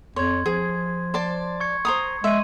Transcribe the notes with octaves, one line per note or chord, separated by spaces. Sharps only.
F2 C#5 C6 G#6
F3 G#4
C5 D5 A5
C#6 G#6 C#7
C5 A#5 D#6
G#3 E5 C6 D#7